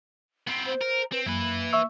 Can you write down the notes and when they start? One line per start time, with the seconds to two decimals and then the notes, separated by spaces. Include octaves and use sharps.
0.47 B3 C4
0.66 C5
0.81 A#4
1.12 C4 B4
1.26 F#2 A#3 E4 B4
1.73 E5 C#6 E6